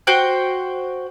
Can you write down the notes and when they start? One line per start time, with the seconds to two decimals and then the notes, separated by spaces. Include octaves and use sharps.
0.07 F#4 C5 G5 F#6